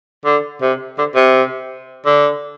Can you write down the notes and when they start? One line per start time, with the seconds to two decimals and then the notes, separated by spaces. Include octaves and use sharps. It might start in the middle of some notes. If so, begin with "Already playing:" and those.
0.26 D3
0.62 C3
0.98 D3
1.15 C3
2.06 D3